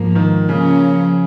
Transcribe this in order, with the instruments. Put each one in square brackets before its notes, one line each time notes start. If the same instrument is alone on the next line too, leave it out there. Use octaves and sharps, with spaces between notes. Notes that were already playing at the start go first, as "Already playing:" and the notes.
Already playing: [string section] G#2 F3 A#3
[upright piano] D#3
[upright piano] C#3 [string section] F3 A#3 C#4